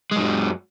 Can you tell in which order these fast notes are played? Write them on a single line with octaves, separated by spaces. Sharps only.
G#3 F#2 F#3